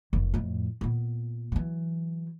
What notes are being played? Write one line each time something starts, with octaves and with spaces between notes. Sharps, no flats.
F1 F#2
F2 A2
A#2 B3
E3 F#3